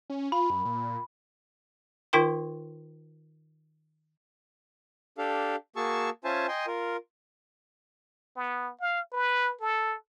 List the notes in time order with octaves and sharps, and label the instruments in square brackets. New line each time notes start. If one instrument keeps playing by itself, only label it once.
[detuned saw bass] C#4
[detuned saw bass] F4 [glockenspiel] B5
[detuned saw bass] F#2
A#2
[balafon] D#3 D#4 F4 A#4 G5 C6
[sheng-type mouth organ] D4 G4 A4 F5
A#3 F#4 G#4 A5 C#6 E6
C#4 F4 C5 E5 G#5 A5
D#5 G5 G#5 C6
F4 A#4
[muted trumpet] B3
F5
B4
A4